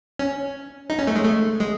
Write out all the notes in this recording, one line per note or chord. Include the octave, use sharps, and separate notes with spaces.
C#4
D#4
C#4
A3
G#3
A3
G#3